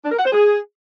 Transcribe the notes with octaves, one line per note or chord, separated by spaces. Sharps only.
D4
A#4
F#5
C5
G#4